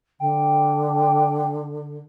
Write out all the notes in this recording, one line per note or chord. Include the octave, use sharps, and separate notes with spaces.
D3 G5